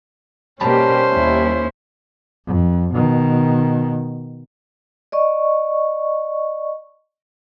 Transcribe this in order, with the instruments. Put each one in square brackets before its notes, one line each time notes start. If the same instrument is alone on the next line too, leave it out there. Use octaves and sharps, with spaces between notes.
[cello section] B2 A#3 G4 [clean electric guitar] G3 A5 B5 [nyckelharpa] C#4 C5
[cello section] D#2 E4
[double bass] F2
B2 D#3
[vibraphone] D5 D#5 C#6